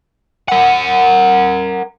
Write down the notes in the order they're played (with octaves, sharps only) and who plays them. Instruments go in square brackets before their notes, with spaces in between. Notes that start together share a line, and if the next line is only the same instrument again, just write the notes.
[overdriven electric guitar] A#4 F#5